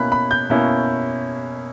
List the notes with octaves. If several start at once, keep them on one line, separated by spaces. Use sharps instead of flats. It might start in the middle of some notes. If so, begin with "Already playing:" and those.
Already playing: B2 A#3 C#4 E4 B5 F#6
B5
G6
B2 A#3 C#4 E4